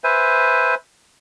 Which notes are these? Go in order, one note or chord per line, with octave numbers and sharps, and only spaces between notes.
B4 C5 E5 G#5